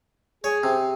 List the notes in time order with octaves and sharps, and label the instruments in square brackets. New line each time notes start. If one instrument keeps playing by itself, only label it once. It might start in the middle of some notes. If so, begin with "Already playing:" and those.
[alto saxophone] G#4 [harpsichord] C#5
[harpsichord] C3